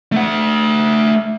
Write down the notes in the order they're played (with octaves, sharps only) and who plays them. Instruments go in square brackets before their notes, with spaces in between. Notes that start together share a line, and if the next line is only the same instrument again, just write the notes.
[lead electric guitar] A3 F#5